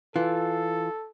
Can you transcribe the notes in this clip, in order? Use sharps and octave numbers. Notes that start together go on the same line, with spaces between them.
E3 F4 A4